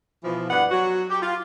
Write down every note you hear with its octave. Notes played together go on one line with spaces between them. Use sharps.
B2 E3 F3
G2 B3 D5 F#5
F#3 F#4
G4
F4